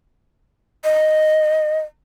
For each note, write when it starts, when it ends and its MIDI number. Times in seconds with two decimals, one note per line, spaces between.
0.84 1.80 75